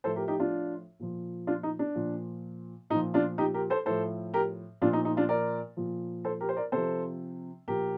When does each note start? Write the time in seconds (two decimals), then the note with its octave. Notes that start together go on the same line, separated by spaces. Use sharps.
0.04 A2 F3 A4 C5
0.16 G4 A#4
0.28 D#4 G4
0.40 D4 F4
1.00 A#2 F3
1.47 D4 F4
1.63 D#4
1.79 D4
1.95 A#2 F3
2.90 A#2 D#4
2.95 F3
3.14 D4 F4
3.38 D#4 G4
3.54 G4 A#4
3.70 A4 C5
3.86 A2 F3 A4 C5
4.34 G4 A#4
4.81 A#2 F3 D4 F4
4.93 D#4
5.05 D#4
5.17 D4 F4
5.29 A#4 D5
5.77 A#2 F3
6.25 A4 C5
6.41 G4 A#4
6.49 C5
6.56 A#4 D5
6.72 C3 F3 A4 C5
7.68 A#2 F3 G4 A#4